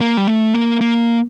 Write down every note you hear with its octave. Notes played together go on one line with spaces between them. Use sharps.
A#3
G3
A3
A#3
A#3